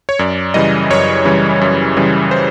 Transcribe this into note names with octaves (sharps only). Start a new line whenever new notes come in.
C#5
F#2 D5
C#3 E3 G3 D#5
F#2 C#5
C#3 E3 G3
F#2
C#3 E3 G3
C5